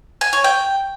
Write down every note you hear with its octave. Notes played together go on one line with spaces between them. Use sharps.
G#5
C#5
G5